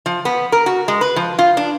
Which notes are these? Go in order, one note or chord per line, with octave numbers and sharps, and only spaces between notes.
F3
B3
A#4
F#4
G#3
B4
F3
F4
D4